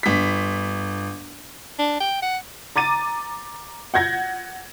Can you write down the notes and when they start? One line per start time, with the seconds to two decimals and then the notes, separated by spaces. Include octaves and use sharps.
0.03 G1 B6
1.79 D4
2.00 G5
2.22 F#5
2.76 A#5 D6 A6 D#7
3.94 F#5 G6 G#6 A#6